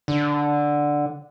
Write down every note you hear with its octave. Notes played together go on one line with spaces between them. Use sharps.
D3